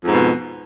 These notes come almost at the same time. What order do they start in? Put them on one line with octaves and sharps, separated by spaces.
F2 G#2 B2